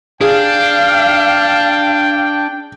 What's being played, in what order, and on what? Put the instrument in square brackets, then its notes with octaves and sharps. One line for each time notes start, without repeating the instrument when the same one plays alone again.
[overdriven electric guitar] D4 [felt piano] G#4 [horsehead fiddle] F5 [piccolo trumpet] G5